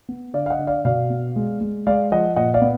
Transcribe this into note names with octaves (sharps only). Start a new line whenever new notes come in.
B3
D3 D5 F5
F5
D#5 F#5
D3
D5 F5
B2 D5 F5
B3
G#3
G#3
G#3 D5 F5
F3 D#5 F#5
A#2 D#5 F#5
D5 F5
B3